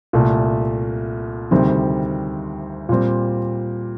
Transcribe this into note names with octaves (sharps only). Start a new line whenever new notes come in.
C2 A#2 A3
D2 C3 D#3 G3 C4
A#2 G3 C4